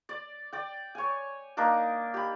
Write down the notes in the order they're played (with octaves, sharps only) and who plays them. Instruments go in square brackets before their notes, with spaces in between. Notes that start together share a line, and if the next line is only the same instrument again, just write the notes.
[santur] D5
D5 G5
C#5 G#5
A#3 D4 D#4 D6
G4 B5